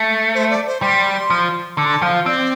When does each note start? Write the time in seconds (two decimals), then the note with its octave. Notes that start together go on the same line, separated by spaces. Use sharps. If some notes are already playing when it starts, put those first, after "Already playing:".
Already playing: A3
0.35 C5
0.50 D5
0.67 C5
0.82 G3 C6
1.30 F3
1.78 D3 A5
1.86 C6
1.94 A5
2.02 F3 F5
2.26 C4 D5